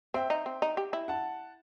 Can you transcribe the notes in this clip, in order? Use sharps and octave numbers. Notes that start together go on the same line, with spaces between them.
C4 E5 G5
D#4
C4
D#4
G4
E4
F#5 A5